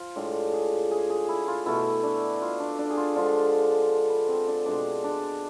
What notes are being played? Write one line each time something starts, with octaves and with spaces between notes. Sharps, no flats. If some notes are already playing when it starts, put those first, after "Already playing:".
Already playing: F3 F4
A2 G#3 D4
G#4
G#4
G#4
E4
F4
B2 A3 E4
D4
F4
D4
D4
G#4
F4
D3 F3 G#3 F4
B4
C4
D4
B2 G#3 D4
D4